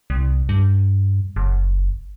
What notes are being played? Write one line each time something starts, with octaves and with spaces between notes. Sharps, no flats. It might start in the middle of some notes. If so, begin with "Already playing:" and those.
C2
G2
F#1